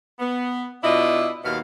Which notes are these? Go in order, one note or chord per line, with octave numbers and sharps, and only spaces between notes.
B3
B2 D4 E4 F4 D#5
D#2 B2 F5